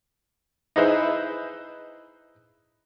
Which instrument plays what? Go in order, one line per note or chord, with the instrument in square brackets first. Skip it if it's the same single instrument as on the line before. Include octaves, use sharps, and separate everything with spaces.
[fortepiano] D#4 E4 G#4 B4 C5 E5